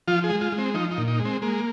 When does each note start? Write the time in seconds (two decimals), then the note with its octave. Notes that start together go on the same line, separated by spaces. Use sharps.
0.08 F3 F4
0.24 G#4
0.30 G#3
0.41 F4
0.52 G#3
0.58 C4
0.74 F3 D#4
0.91 D#4
0.98 A#2
1.08 D#4
1.20 G#3
1.25 C4
1.42 G#3 A#3